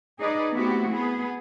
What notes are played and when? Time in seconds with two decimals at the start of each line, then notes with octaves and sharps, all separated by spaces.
0.20 D#4 G#4 B4 D5 D#5
0.52 A3 B3 C4 E4 F#4 G4
0.91 B3 G#4